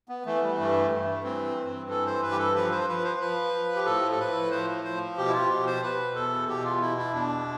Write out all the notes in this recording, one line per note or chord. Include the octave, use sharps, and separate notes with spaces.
B3
E3 A3
G3
G2 A3
G2 A3
E3 C4
G2
E3 A4
C5
G2 B4
G4
A4
F3 B4
C5
F3 B4
C5
F3 B4
F3
G4
A2 A4
A4
A2 B4
F3 C5
F3 C5
B2 G4
E4
F4
B2 G4
C5
B2 B4
E2 A4
B2 G4
F4
B2 E4
E4
E2 D4